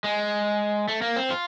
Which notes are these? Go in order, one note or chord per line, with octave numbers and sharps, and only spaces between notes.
G#3
A3
A#3
C4
F4